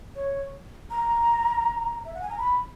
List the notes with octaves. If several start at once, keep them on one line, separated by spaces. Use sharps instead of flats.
C#5
A#5
E5
F#5
G#5
A#5
B5